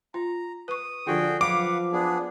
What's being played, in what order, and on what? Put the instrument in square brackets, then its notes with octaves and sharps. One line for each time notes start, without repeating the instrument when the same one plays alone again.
[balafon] F4 [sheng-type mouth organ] A#5
[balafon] B4 C#6 [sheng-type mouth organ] D#6
[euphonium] D3 [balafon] F3 F4 [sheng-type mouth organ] F#4 G#4 G5
[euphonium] F3 [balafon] F#3 [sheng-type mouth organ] B4 F5 F#5 [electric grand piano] D6
[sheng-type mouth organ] B3 D4 G#4